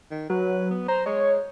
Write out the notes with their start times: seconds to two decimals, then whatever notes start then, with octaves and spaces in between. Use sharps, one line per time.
0.11 D#3
0.30 F#3 B4
0.71 B3
0.88 C5 A#5
1.06 G#3 C#5